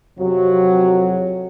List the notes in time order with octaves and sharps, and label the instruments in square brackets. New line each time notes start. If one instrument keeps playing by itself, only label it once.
[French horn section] F2 C3 F#3